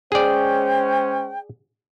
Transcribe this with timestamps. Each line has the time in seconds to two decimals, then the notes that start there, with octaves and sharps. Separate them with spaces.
0.12 G#3 C#4 G#4 C5 D5 G5